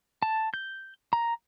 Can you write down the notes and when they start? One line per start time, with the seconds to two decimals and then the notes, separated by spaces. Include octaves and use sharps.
0.23 A5
0.54 G6
1.13 A#5